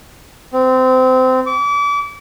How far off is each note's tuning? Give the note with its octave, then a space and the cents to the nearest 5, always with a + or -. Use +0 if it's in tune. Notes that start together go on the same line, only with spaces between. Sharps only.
C4 -25
D6 -35